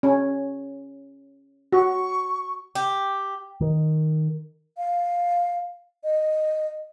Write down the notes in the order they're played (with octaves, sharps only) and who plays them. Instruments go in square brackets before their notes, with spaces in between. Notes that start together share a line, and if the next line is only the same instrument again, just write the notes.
[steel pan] C#4
[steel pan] F#4 [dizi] C#6
[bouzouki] G4
[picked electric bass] D#3
[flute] F5
D#5